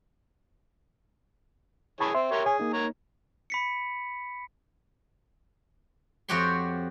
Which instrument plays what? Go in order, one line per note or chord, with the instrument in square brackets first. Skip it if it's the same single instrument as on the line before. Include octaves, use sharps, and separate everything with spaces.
[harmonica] E3 G#4 C#5 [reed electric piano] A5 B5 C#6
[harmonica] C4 [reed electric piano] E5 C6
[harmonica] G4 A#4 C#5
[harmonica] G#4 [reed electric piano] C#5 G#5
[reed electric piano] A#3 D#4
[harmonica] A#4 C#5 A#5
[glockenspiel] B5 B6 C#7
[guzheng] F2 F3 F#4 G4 C#5 C6